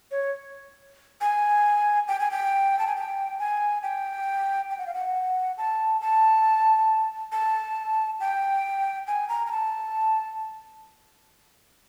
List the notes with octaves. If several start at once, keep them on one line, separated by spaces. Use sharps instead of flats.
C#5
G#5
G5
G#5
G5
A5
G#5
G5
G#5
G5
G5
F#5
F5
F#5
A5
A5
A5
G5
G#5
A#5
A#5
A5